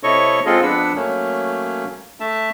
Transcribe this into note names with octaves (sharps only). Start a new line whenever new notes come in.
C3 E4 A4 C#5 D#5 C#6
G#3 C4 F4 G#4 A4 D#5
F2 B3 D4 B4 F#5 E6
F#3 A3 A#3 C#4
A3 E5 A5